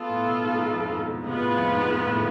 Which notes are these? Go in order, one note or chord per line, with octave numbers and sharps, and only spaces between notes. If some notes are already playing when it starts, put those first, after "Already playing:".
Already playing: B3 F4 A4
A2
B2
G#2
G#2
F2
G#2
B2
C3 G#3 B3 F4 B4
A2
F2
G#2
G#2
A2
D3